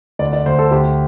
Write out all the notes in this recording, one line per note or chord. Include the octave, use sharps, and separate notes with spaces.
D2 D5
D5
D2 C5
A4
D2 G4